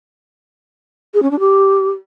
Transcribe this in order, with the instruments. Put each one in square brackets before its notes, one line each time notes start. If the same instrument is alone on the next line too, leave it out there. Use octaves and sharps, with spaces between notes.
[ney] G#4
C#4
D4
G4